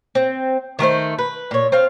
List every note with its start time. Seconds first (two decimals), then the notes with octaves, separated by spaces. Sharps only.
0.15 C4
0.79 D#3 A3 A#4 C5
1.18 B4
1.51 A#2 C#5
1.72 C4 F4 F5